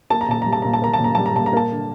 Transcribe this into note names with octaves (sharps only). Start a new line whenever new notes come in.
A#3 A5
A#5
A#2 A5
G3 A#5
A5
A#2 A#5
A5
A#3 A#5
A5
A#2
A#5
G3 A5
A#5
A#2 A5
A#5
A#3 A5
D3